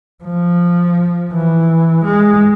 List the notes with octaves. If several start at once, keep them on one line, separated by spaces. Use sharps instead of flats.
F3
E3
G#3